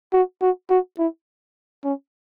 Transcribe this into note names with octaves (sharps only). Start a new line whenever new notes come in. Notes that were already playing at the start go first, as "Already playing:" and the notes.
F#4
F#4
F#4
E4
C#4